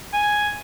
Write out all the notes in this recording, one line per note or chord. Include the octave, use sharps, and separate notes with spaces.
G#5